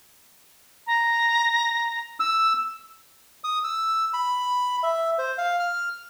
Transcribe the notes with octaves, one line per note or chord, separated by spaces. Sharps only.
A#5
E6
D#6
E6
B5
E5
C5
F5
F6